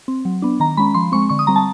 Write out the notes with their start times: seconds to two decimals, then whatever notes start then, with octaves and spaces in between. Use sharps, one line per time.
0.08 C4
0.25 F#3
0.42 B3 D4
0.60 D#3 A#5
0.77 G#3 C#4 B5
0.94 F3 C6
1.12 G#3 C4 C#6
1.29 D3 C#6
1.39 D#6
1.47 G3 C4 A#5
1.56 A5